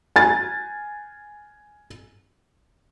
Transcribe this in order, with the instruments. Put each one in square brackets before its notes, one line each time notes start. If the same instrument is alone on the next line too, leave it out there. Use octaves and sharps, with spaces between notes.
[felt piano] G#5 A6